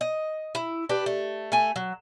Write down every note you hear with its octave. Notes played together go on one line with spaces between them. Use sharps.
D#5
E4
D4 G4 B4
A3
A3 G#5
F#3